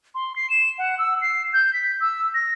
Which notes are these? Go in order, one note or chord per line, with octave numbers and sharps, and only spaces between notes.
C6
C7
E7
F#5
E6
C7
G6
B6
E6
A#6